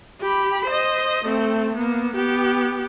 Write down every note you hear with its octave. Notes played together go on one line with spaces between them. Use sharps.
G4 B5
C5 D#5
A3 C4
A#3 B3
B3 G4